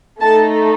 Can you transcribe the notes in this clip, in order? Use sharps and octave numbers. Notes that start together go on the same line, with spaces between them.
A3 D#4 A4 A5